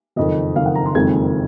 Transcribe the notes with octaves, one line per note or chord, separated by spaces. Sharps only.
F#1 F2 D#3 D#5
F#1 F2 D#3 F5
F#5
A#5
C6
F#1 F2 D#3 G#3 C4 G#6